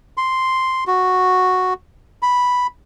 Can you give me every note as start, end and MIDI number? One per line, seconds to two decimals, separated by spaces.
0.17 0.84 84
0.87 1.74 66
2.22 2.67 83